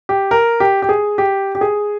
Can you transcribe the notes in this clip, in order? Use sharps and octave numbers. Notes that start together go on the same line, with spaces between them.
G4
A#4
G4
G4
G#4
G4
G4
G#4